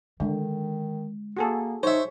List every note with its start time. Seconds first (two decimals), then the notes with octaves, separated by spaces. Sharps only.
0.20 D3 D#3 G#3
1.37 A#3 F#4 G#4 A4
1.83 D#4 C5 C#5 E5